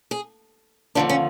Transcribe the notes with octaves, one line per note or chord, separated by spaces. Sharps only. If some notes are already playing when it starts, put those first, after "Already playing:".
G#4
D#2 D3 F3 D4
C#4